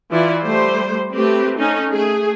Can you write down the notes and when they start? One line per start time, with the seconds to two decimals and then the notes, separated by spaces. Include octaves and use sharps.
0.11 E3 E4 F4 D5
0.43 G3 A3 C5
1.13 A3 C4 G4 B4
1.57 C#4 D#4 A4
1.92 A3 G#4